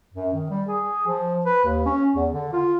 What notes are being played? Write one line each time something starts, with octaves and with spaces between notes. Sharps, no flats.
F#2
D#3
G3
G#4
F3
B4
D#2
C#4
E2
D3
F4